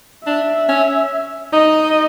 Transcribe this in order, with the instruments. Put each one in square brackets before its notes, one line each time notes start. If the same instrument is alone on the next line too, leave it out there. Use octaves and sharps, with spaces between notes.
[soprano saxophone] D4 [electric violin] E5
[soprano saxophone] C#4
[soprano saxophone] D#4 [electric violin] D#5